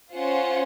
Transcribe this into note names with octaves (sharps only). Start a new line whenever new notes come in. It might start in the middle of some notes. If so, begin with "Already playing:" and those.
C#4 F4 C5 F#5